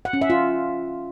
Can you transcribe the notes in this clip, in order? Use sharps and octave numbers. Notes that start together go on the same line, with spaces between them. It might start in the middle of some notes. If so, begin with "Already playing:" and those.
F#5
C#4
E5
F4